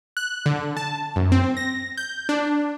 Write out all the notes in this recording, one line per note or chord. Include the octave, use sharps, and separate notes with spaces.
F#6
D3
A5
F#2
C4
A#6
G6
D4